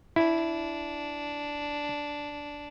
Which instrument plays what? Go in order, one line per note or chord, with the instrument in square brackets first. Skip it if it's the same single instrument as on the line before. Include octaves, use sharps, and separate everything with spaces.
[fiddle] D4 [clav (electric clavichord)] E4